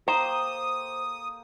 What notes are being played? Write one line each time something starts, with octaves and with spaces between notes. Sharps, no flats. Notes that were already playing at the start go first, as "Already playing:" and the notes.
A#3 G4 A4 C5 A#5 D#6